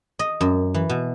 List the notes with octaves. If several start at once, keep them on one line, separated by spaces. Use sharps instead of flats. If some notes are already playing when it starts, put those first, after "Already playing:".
D#5
F#2
E3
B2